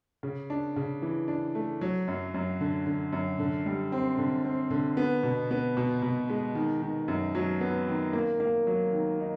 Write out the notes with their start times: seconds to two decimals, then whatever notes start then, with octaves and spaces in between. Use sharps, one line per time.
0.23 C#3
0.50 D4
0.76 C#3
1.02 E3
1.28 D4
1.55 A3
1.81 F#3
2.08 F#2
2.34 F#2
2.61 D3
2.86 D3
3.13 F#2
3.39 D3
3.66 G3
3.92 C4
4.18 D3
4.44 C4
4.71 D3
4.97 B3
5.23 B2
5.51 B3
5.77 B2
6.02 B2
6.30 G#3
6.55 D#3
6.82 D#3
7.08 F#2
7.35 F#3
7.61 B3
7.88 D#3
8.13 A#3
8.40 A#3
8.67 F#3
8.93 D#3
9.20 D#4